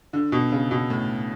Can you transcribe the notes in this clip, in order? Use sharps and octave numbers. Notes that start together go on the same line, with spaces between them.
D3
B2
C#3
B2
A2